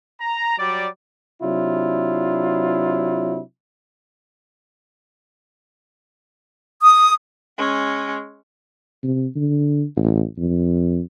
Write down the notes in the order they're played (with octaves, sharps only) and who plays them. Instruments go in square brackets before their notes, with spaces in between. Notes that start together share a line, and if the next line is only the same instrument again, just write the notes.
[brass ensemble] A#5
F#3 G3 D5
[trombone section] C3 F#3 D4 E4 F4
[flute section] D#6
[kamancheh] G#3 C#4
[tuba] C3
D3
A1
F2